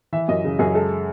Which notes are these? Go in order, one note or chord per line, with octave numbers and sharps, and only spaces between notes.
E3 E5
F#2 D#5
C#3
F#2 G#4
G#3 A4